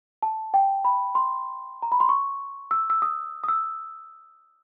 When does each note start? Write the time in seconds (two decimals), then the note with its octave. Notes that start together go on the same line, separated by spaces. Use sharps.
0.23 A5
0.54 G5
0.85 B5
1.15 C6
1.82 A#5
1.92 B5
2.00 C6
2.09 C#6
2.71 E6
2.90 E6
3.02 D#6
3.44 D#6
3.48 E6